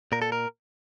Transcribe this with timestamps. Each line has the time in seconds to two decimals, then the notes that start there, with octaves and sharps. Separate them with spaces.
0.12 A#2 A#4
0.22 A4
0.32 A#4